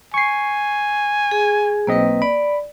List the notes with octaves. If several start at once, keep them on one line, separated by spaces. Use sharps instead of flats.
G#5 C#6 C7
G#4
B1 A#3 C4 B4 D#5
D5 B5